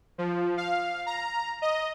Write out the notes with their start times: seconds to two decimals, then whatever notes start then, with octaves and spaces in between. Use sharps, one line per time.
0.18 F3
0.57 F5
1.06 A#5
1.62 D#5